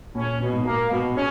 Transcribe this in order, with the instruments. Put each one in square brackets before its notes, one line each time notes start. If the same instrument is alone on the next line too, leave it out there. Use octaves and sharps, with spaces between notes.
[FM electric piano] A#2 [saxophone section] C#4
[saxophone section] B2
[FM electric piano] G#2
[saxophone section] A#3
[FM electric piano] G#2 [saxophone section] B2
[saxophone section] C#4